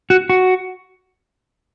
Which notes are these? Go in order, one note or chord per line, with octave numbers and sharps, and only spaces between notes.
F#4
F#4